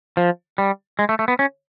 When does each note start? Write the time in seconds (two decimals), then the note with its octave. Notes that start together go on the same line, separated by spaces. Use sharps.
0.17 F3
0.58 G3
0.99 G#3
1.09 A3
1.19 A3
1.28 B3
1.39 C#4